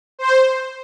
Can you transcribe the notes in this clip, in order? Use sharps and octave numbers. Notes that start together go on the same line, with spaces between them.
C5